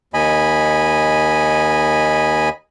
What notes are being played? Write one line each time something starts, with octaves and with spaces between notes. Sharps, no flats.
D#2 D#5 G#5 B5